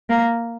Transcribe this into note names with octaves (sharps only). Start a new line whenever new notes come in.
A#3